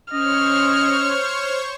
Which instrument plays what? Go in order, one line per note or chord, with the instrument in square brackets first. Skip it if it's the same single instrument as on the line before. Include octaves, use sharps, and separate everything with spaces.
[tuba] C#4 [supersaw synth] C5 C#5 C#6 [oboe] D#5 [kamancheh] F6